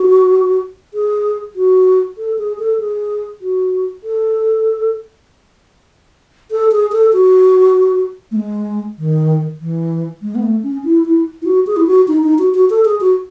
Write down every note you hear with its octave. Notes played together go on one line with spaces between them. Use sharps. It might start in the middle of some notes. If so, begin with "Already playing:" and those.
Already playing: F#4
G#4
F#4
A4
G#4
A4
G#4
F#4
A4
A4
G#4
A4
F#4
A3
G#3
D#3
E3
G#3
B3
A3
C#4
E4
E4
E4
F#4
G#4
E4
F#4
D#4
D#4
F#4
F#4
A4
G#4
F#4